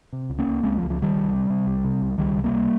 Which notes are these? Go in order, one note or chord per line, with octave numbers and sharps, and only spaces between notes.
C3
C#2
A#3 C#4
C#2
C#2 G#3 C4
F3
C#2
F3
C3
D#3 G3
C2
C3
C3
C2
C3
C2
C#2 D#3 G3
C3
G3 A#3
C#2